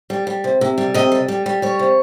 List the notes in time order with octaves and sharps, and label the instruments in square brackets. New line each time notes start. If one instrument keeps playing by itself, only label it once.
[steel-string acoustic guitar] G3
G3
C3
C3
G3
C3 D#5
G3
G3
G3
G3 C#5
C3